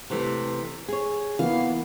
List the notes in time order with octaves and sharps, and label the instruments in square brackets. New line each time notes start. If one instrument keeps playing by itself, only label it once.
[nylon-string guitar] C3 E3 A3
G#4 C#5
[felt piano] E3 A#3 B3 [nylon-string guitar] F5